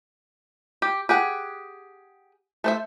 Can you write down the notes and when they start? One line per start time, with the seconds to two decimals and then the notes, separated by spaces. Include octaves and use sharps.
0.82 G4
1.09 G4 G#4 F#5
2.64 A3 C5 E5